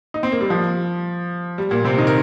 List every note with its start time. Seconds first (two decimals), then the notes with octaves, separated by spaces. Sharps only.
0.14 D#4
0.23 C4
0.32 A#3
0.41 G3
0.50 F3
1.58 G3
1.71 A#2 A#3
1.84 C3 C4
1.98 D#3 D#4
2.07 A#4